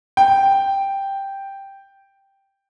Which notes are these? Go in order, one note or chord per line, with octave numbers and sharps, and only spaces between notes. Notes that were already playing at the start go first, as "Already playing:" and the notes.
G5